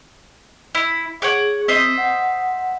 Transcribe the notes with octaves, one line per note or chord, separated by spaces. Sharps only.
E4
G#4 C#5 F#5 D6
C4 C5 D#5 E5
F#5